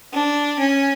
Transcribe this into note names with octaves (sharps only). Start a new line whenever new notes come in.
D4
C#4